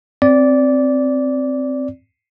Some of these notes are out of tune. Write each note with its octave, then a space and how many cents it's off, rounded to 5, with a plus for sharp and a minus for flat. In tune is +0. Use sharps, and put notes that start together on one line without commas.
C4 +0 D5 -15